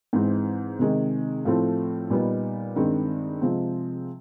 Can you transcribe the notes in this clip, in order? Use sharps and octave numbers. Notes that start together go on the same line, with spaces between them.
G#2 E3 G#3 C4
C3 D#3 G#3
A2 F3 A3 C4
A#2 G3 B3 D#4
G2 D#3 G#3 C4
C3 F3 G#3 C4